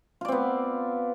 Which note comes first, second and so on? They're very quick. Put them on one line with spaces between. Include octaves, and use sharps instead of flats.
F4 D5 C4 B3